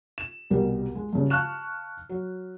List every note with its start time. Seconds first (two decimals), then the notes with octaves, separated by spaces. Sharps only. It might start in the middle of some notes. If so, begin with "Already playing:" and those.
0.18 E7
0.50 C2 B2 G3 A#4
0.95 G#3
1.13 G2 C#3
1.30 F5 A5 C#6 F6 F#6 E7
2.09 F#3